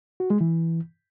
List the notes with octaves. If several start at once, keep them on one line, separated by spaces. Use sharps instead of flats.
F#4
G#3
E3